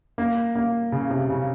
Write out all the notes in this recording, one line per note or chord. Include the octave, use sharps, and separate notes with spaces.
A#3
A#3
C#3
C3
C#3